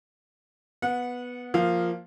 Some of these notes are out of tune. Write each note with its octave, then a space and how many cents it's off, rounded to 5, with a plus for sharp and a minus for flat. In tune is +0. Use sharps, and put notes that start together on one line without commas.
B3 +0 F#5 -20
F3 +0 A#3 +0 F5 -5